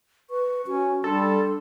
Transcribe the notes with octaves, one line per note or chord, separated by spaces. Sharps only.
B4 C#6
C#4 F#4
G3 D4 A4 C6